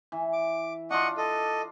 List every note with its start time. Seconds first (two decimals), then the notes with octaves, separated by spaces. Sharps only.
0.12 E3
0.33 D6
0.91 D4 F4 D#5 F#5 C#6
1.17 A4 D#5